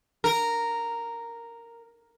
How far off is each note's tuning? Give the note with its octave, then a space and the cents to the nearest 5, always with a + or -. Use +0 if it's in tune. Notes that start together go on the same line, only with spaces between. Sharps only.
A#4 -5